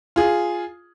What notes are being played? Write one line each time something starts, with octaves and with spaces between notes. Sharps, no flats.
F4 G#4